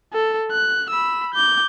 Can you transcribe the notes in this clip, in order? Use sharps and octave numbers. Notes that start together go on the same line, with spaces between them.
A4
F#6
B5 E6
D6 G6